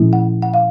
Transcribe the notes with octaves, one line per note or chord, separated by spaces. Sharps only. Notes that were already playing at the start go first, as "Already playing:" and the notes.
Already playing: A#2 F3 A3 C#4 E4
F#5
F#5
F5